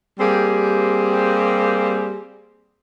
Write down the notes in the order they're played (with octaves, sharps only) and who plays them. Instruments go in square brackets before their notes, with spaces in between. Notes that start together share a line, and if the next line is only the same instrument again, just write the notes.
[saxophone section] G3 A#3 C4 G4 G#4